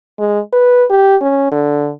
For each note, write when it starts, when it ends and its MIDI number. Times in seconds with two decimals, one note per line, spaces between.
0.19 0.40 56
0.53 0.85 71
0.90 1.16 67
1.21 1.47 61
1.52 1.91 50